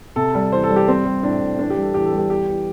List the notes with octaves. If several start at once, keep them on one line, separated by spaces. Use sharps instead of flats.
C3 A4
G3
E2 C5
A4
G3
G4
G3 C4
G3
A2 D4
A2
E3 D4
G4
G3
A4
E2 G4
A4
G3
G4
E2 G4
E2